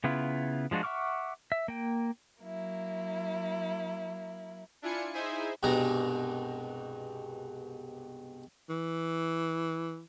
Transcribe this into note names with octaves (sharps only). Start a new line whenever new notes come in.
C#3 B3 E4 F4
F3 G#3 D4 F4 F#4
E5 F#5 C#6 D6 F6
E5
A#3 G5
F#3 A#3 E4
D4 E4 F4 G#5 C#7
D#4 E4 G#4 C5 E5 G#5
C2 G2 B2 G#3 A#5
E3